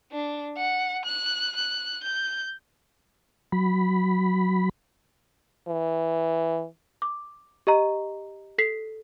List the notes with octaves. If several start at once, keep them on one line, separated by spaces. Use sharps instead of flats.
D4
F#5
F#6
F#6
G6
F#3 B5
E3
D6
G4 D#5 A#5
A4 B6 C7